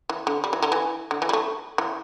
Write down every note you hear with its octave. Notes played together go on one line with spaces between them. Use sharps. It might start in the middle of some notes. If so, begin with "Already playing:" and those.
E3
D3
G3
E3
D3
E3
D3
E3
G3
A3
E3